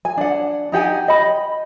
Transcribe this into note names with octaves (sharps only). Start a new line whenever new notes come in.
G#5
D4 F#5
D#4 G4 F#5 G#5
D#5 B5